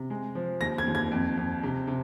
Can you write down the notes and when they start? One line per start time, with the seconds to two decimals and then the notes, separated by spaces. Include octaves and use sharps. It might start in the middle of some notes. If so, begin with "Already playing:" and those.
Already playing: C3
0.10 G#3
0.35 F3
0.61 D#2 A#6
0.78 G#6
0.87 D#2
0.95 G#6
1.12 F2
1.37 F2
1.63 C3
1.88 C3